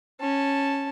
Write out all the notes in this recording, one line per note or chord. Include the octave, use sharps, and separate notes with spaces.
C#4 A5